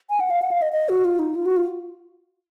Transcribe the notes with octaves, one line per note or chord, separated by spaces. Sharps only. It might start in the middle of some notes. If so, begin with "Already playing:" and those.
G#5
F#5
F5
F#5
F5
D#5
D#5
F#4
F4
D#4
F4
F#4
F4